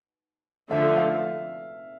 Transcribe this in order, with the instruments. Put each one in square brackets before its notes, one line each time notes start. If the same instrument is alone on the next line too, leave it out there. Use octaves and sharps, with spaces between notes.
[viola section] D3 F3 A3 [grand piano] E5
[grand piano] F5